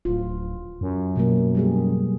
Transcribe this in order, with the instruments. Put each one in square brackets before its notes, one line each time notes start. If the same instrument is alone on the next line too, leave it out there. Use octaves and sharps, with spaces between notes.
[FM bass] D1 [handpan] F4
[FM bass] F#2
[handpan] B2 F#3 A#3
G3 G4 G#4